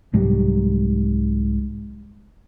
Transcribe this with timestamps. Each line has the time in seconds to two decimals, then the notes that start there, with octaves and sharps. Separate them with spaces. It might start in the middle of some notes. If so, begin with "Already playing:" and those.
0.13 C2 G#2 F#3 G3